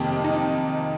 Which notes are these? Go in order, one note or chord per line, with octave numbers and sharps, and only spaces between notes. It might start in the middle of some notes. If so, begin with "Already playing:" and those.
Already playing: F2 C3 D#3 A#3 G4
D#4